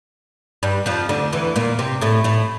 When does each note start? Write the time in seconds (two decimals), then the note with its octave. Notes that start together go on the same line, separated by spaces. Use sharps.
0.63 G2 G3
0.86 F2 F3
1.09 D2 D3
1.32 E2 E3
1.56 A#2 A#3
1.79 C3 C4
2.01 A2 A3
2.24 A2 A3